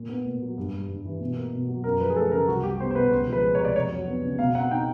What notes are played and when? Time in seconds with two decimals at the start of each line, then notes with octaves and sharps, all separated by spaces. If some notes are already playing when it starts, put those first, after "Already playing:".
Already playing: A#2
0.09 B3
0.26 A#2
0.42 F#3
0.57 G2
0.74 G3
0.88 G2
1.05 E3
1.20 B2
1.36 A#3
1.53 B2
1.68 F#3
1.84 F#2 A#4
2.00 F3 B4
2.10 G#4
2.16 A3 A4
2.32 C#3 A#4
2.48 C2 F#4
2.63 G3 G4
2.80 B3 C5
2.91 C5
2.95 B2 B4
3.11 C#2 C5
3.27 F3
3.33 B4
3.43 G#3
3.55 C3 C#5
3.65 D5
3.76 F2 C#5
3.91 F#3
4.07 B3
4.23 C#3
4.39 B2 F5
4.55 C4 F#5
4.71 D#4 G5